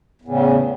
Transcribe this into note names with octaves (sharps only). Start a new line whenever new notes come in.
E2 A2 C#3